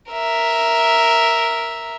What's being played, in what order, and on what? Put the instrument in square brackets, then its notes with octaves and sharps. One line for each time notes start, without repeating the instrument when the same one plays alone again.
[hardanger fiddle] A#4 E5